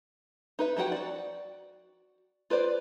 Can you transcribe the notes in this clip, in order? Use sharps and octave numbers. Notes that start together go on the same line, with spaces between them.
D#4 B4 E5
F3 D#4 F#4 F#5 G5
F#4 D5
F4 B4 C5 D5